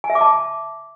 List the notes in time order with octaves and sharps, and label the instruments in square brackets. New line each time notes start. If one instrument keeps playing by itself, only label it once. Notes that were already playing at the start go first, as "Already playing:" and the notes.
[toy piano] G#5
E5
D6
A5